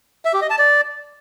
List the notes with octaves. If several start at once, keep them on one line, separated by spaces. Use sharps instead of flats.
E5
G4
D#5
A5
D5